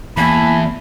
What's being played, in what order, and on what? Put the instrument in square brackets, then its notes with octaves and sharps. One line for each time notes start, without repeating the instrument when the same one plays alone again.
[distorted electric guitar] E2 [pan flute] A#3 [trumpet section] G#5 A5 B5